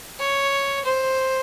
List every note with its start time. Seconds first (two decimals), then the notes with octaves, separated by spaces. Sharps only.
0.19 C#5
0.85 C5